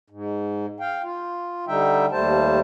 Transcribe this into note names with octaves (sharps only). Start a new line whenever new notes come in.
G#2
F5 G5
F4
D3 G3 D#4 E5 G5
D#2 G3 A3 C5 A5